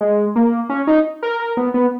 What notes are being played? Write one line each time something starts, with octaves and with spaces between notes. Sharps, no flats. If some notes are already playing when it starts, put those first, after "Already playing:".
G#3
A#3
C#4
D#4
A#4
A#4
B3
B3